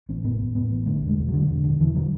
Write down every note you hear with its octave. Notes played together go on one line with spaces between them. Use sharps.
A1 C#4
A2 B3
A2
A2 B3
A1
D3 A3
E1
G#3
E1
F#3
D3
E1
E1 D3
E1 E3
D3 F#3